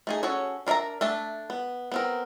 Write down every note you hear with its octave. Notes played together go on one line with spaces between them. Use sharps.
A3 D#4 G#4
C#4 F#4 G#4 A4 C#5
D4 A#4 D#5 E5 A#5
A3 D4 E5 A5
B3
B3 C4 A#4